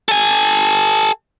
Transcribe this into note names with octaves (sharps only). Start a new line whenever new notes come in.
A4 G#5